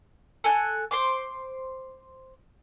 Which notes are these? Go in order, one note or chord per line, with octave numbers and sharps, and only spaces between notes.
A4 G#5 F#6
C5 C6 D6